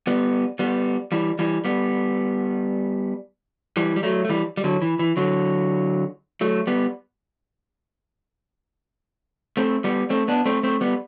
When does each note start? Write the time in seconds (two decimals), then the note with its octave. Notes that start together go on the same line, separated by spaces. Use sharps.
0.07 G3 B3
0.59 G3 B3
1.12 E3 G3
1.39 E3 G3
1.65 G3 B3
3.77 E3 G3
3.96 G3
4.03 F#3 A3
4.25 A3
4.29 E3 G3
4.57 G3
4.64 D3 F#3
4.82 E3
4.99 E3
5.17 D3 F#3
6.41 F#3 A3
6.67 G3 B3
9.57 A3 C4
9.84 G3 B3
10.10 A3 C4
10.28 B3 D4
10.46 A3 C4
10.63 A3 C4
10.81 G3 B3